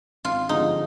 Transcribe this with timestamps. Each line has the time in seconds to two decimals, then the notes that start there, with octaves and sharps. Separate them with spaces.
0.25 G#1 F4
0.49 G2 D3 F3 G#3 D#4